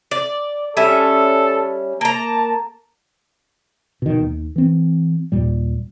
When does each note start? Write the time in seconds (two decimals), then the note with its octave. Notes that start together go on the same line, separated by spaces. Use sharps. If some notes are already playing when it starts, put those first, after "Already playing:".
0.11 D5
0.77 G3 C#4 A4 E5
2.01 A#3 A5 A#5
4.02 B2 D#3
4.19 D#2
4.56 E3 C4
5.32 D#2 A#2 G3